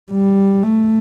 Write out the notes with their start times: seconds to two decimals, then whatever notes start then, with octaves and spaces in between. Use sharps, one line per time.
0.12 G3
0.63 A3